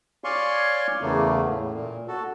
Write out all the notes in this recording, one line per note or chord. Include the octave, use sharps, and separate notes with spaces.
C#5 D5 F5 G#5 C6 C#6
E2 C#3 A3 A#3
A2
A#2
F#4 A4